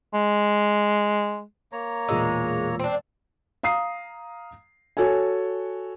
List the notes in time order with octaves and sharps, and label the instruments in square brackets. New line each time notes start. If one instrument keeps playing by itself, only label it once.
[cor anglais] G#3
[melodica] A#3 C#5 A#5
[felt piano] E1 A#2 E6 [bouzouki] G#3
[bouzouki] C4 D4
[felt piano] F5 A#5 D#6 C7
F#4 A4 C#5 G#5